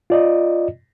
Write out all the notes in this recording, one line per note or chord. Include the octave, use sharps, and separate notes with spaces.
F4 D5 D#5